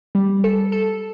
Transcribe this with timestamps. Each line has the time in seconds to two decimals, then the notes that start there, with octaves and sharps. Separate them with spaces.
0.15 G3
0.44 A4
0.72 A4